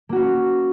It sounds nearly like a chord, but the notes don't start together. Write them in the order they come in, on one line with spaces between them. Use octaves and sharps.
A#3 F#4 C#4